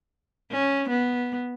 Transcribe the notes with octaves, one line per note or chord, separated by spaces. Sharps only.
C#4
B3